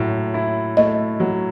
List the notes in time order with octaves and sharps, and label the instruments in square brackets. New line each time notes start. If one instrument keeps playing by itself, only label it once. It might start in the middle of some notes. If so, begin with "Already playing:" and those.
Already playing: [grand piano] A2 F#3 A3
E4
[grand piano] A3 [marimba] D#5
[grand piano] F#3